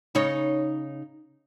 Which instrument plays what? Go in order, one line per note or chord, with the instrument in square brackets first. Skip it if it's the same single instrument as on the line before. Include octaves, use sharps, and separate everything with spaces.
[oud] C#3 D#4 C#5